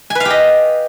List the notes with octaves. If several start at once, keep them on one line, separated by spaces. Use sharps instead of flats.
G#5
B4
F5
G4
D#5